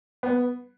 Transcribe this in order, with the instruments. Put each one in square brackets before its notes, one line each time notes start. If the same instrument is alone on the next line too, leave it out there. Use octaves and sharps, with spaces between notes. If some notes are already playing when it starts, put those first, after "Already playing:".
[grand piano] B3